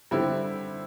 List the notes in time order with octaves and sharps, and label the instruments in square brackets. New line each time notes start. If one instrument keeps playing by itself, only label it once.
[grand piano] D3 G3 C4 E4